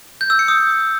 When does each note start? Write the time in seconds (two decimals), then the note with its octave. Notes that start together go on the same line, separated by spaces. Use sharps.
0.21 G6
0.30 E6
0.39 C#7
0.48 D#6